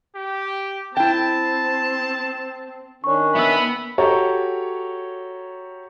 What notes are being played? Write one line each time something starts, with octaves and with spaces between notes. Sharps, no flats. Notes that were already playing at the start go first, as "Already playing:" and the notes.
G4
C4 E4 G5 A5
D#3 C#4 D4 C#5 C#6
B3 E5 B5 E6
F#4 G4 A4 C#5 A#5